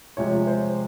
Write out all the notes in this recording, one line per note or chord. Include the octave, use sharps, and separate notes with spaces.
C3 F3 G#3 C#5
C5